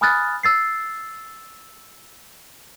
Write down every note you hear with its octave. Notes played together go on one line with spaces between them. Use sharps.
G#5 B5 D#6 F6 F#6 A6
E6 A6 C7